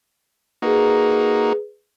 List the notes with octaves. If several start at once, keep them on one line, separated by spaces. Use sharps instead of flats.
A#3 D#4 F#4 G#4 B4